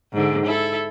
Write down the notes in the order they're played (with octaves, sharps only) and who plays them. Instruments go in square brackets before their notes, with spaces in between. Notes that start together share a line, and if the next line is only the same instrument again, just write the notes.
[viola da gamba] G#2 D3
E4 A4